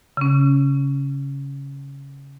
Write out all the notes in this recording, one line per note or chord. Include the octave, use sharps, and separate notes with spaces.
C#3 C#4